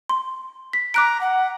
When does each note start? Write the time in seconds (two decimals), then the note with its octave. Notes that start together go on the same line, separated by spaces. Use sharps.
0.09 C6
0.73 B6
0.94 A#5 D6 F#6 D7
1.21 F#5